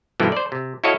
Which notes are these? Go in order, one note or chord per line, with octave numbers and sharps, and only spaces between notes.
G2 B2 D3 E3 F3 G3
C5 D5
C3
E4 F#4 A4 C#5 D#5 F5